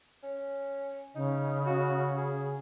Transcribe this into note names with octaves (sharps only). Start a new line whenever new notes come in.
C#4
C#3 D#4
F#4
G#4